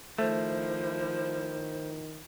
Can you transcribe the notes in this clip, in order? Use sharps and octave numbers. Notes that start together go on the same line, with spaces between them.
D#3 F3 A3 E4 C5